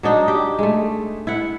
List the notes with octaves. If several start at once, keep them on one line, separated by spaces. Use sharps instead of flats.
F#3 D4 D#4
G4
G#3 A3
E4 F#5